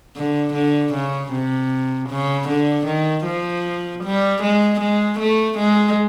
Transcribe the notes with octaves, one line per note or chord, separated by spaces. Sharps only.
D3
D3
C#3
C3
C#3
D3
D#3
F3
G3
G#3
G#3
A3
G#3